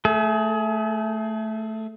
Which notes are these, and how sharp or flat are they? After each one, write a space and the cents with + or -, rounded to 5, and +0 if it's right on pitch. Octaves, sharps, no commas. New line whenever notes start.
A3 +0 G#4 +30